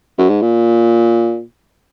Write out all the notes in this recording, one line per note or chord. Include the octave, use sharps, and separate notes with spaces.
F#2
G#2
A#2